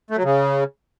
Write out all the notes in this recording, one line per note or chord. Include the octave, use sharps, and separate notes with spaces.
A3
F#3
C#3